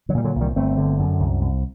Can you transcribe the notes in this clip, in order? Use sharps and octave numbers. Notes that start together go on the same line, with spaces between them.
D3 F#3
A#2 G3
D3 F#3
C2
D#3 G3
G1 A3 C4
D3
F#2
C2
C2